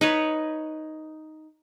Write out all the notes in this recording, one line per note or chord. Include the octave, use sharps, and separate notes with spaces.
D#4 B4 C#5